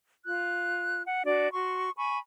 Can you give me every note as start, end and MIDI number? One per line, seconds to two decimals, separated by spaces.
0.25 1.02 65
0.25 1.02 90
1.06 1.21 78
1.24 1.51 62
1.24 1.51 66
1.24 1.51 74
1.52 1.90 66
1.52 1.90 84
1.52 1.90 85
1.97 2.18 80
1.97 2.18 83
1.97 2.18 85